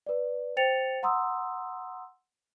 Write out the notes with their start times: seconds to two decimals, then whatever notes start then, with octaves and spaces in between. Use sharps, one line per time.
0.06 B4 D5
0.57 C5 G5 A6 C#7 F7
1.03 F#5 A#5 C6 D#6 E6